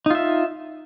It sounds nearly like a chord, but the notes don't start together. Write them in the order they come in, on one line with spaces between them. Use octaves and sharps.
D#4 F4 E5